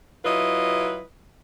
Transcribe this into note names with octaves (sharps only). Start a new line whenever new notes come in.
F#3 E4 F4 B4 D#5